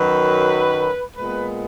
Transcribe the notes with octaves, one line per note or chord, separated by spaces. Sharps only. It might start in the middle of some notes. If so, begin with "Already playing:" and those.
Already playing: F#2 D#3 F#3 B4
A#2 G#3 B3 B4